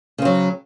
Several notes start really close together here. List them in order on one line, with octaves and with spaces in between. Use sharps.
C#3 C4 F#3